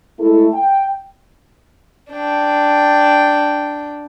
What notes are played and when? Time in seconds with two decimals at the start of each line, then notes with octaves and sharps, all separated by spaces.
0.19 G#3 A3 E4 A4
0.54 G5
2.11 D4 G5